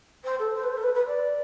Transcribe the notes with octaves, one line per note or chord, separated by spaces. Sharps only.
C5
A4
C5
B4
C5
A4
B4
B4
D5